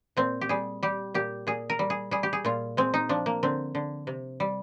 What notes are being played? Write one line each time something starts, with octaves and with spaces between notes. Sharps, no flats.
A#2 C4
G4
G3 G#4
G3 G4
A#2 G4
A#2 G#4
A#4
G3
G#4
G3 G#4
G4
G#4
A#2 F4
G#3 C4
D#4
F3 D4
A#3
D3 C4
D3
C3
G3